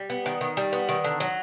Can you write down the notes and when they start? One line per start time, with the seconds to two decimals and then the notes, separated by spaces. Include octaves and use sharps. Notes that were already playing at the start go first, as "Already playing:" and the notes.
Already playing: G3
0.10 B3
0.26 D#3
0.41 D#3
0.57 G3
0.73 B3
0.89 D#3
1.04 D3
1.20 F#3